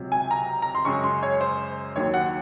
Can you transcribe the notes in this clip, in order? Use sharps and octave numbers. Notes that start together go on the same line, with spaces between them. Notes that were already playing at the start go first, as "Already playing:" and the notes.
Already playing: C#2 C3 F#3
G#5
A#5
A#5
C6
F#2 C#3 G#3 C#6
C6
C#5
C5
D#2 D#3 F#3 C#5
F#5